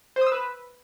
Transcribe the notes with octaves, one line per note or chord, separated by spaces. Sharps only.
C5
D#6
E6
B4